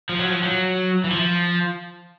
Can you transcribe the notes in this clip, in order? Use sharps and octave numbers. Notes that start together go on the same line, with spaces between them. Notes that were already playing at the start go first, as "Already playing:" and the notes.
F3
F#3
F3
F#3
E3
F3